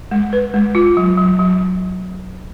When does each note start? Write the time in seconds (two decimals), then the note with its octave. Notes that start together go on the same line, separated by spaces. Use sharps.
0.11 G#3
0.33 B4
0.54 G#3
0.75 F4
0.97 F#3
1.18 F#3
1.39 F#3